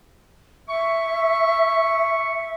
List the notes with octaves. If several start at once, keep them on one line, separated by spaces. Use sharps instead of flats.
E5 C#6